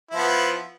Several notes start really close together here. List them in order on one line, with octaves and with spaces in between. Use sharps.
E4 F3 B3